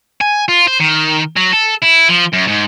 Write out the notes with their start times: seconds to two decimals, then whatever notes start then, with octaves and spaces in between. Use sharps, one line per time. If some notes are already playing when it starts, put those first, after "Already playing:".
0.21 G#5
0.48 F4
0.67 C5
0.80 D#3
1.37 F#3
1.54 A4
1.83 E4
2.09 F3
2.33 F#2
2.48 G#2